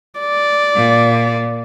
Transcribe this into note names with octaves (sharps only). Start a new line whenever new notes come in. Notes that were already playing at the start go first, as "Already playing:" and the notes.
D5
A#2